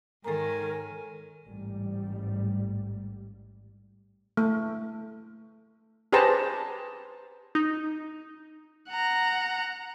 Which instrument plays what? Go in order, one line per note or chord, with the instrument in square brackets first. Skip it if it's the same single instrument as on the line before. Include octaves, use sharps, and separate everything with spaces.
[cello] G#2 D#3 [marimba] A4 A#5 [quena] A#4 [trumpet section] C#5 G#5
[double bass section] A1 G#2 G3
[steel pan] A3
G4 G#4 B4 C5 A5 A#5
[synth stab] D#4
[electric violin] F#5 A#5